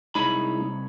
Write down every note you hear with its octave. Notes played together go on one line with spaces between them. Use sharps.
C2 G#3 D#4 E4 C#5 B5